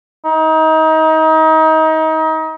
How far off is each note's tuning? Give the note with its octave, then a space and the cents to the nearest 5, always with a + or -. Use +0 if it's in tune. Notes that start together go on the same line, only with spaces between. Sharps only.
D#4 +30